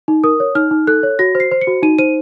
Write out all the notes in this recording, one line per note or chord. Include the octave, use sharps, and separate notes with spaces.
D#4
A#4 D#6
C#5
D#4 F6
D#4
A4 F#6
C#5
F#4 A#6
C5
C7
C5
C#7
F#4
D#4 D#7
C5 D#7